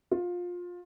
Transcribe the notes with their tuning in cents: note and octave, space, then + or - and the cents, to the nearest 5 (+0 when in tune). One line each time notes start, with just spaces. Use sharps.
F4 +20